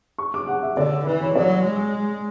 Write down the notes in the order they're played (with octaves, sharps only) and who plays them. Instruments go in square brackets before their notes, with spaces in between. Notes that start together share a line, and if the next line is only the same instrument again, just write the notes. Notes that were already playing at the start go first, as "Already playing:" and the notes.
[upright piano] C#6
D6
F#5
E5
[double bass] D3 [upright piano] D5
[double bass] E3 [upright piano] B4
[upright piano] C#5
[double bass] F#3 [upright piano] D5
[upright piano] C#5
[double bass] G#3